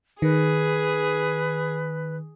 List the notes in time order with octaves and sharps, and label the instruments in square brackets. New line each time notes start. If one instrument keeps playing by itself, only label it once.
[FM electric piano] D#3 [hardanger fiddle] G#4 [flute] B4